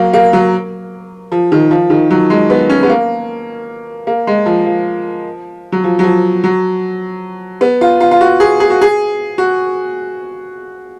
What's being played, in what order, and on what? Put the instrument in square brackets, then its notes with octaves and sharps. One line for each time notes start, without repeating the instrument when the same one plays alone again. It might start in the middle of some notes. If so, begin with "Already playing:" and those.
Already playing: [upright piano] F#3 A#3
A#3
F#3
F3
D#3
F3
D#3
F#3
G#3
B3
C#4
B3
A#3
A#3
G#3
F3
F3
F#3
F3
F#3
F3
F#3
B3
F4
F4
F4
F#4
G#4
G#4
F#4
G#4
F#4